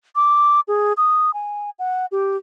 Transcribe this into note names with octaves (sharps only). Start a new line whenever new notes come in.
D6
G#4
D#6
G#5
F#5
G4